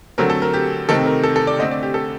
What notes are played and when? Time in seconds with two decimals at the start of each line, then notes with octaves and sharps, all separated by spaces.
0.18 D3 F#3 A3 C4 A#4
0.30 A4
0.42 A#4
0.54 G4
0.89 C3 D#3 A3 C4 A4
1.06 A#4
1.24 A4
1.36 A4
1.47 D5
1.59 D3 A3 C4 D#5
1.71 D5
1.83 G4
1.94 A4